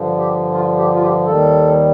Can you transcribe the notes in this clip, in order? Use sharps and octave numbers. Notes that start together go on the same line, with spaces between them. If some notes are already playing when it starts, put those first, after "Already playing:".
Already playing: G2 D3 F3
G4
F4
G4
F4
G4
D#2 D#3 G3 A4